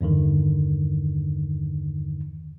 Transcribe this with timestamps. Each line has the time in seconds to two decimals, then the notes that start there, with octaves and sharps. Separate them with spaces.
0.01 E2 G2 D3 D#3